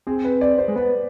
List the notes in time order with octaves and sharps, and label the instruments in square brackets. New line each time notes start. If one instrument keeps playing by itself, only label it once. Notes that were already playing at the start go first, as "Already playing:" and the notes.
[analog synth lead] C4 [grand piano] G#4
[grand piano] B4
D5
C5
[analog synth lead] G#3
[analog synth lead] B3 [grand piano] B4